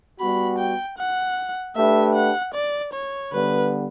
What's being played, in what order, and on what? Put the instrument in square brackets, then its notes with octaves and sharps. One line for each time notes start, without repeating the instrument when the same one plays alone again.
[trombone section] G3 B3 F#4 [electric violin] B5
[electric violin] G5
F#5
[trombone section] A3 D4 G4 B4 [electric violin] E5
[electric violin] F#5
D5
C#5
[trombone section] D3 G3 B3 [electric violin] B4